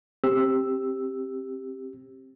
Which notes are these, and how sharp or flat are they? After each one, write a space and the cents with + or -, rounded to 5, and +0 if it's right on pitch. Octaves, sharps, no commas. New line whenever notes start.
C4 +20 G4 +0 E6 +0